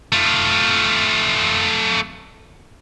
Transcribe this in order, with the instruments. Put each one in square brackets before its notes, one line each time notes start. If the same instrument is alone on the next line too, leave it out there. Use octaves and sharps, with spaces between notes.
[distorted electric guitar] A3 F4